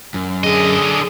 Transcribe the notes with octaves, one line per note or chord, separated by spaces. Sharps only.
F#2
D3 G#4 D#5